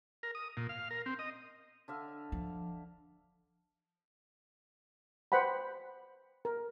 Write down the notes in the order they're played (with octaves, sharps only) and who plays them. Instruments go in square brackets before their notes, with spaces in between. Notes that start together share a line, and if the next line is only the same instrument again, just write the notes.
[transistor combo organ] A#4
D#6
A#2
F5
A#4
C4
D#5
[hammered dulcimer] D3 E5 F5
[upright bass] F3
[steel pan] B4 C5 F#5 G5 B5
A#4